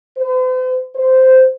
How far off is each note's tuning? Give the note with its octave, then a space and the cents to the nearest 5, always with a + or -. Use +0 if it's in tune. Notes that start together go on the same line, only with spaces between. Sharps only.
C5 -45
C5 -10